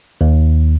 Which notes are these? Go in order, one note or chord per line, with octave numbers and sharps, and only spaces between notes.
D#2